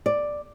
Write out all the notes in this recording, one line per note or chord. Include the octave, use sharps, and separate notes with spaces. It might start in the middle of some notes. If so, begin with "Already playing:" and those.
D5